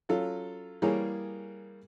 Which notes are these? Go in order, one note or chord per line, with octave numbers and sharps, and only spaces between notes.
F#3 C#4 F4 A4
E3 G3 A#3 G#4 A#4 C#5